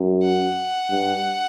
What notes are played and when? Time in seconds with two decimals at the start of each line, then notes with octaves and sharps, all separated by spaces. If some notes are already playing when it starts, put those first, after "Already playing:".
Already playing: F#2
0.23 F#5
0.90 G2